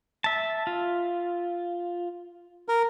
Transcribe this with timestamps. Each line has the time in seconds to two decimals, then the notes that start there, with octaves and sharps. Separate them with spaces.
0.24 E5 A5
0.67 F4
2.68 A#4